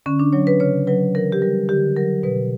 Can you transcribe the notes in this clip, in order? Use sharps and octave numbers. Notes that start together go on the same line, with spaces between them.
D3 C#4
D4
F#3 C#5
B4
C#3 C#5
F#3 B4
E3 A#4
G4
G3 A#4
D3 G4
F#3 A#4
B2 B4